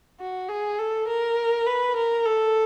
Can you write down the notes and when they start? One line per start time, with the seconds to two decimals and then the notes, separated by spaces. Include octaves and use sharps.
0.20 F#4
0.49 G#4
0.79 A4
1.08 A#4
1.67 B4
1.96 A#4
2.25 A4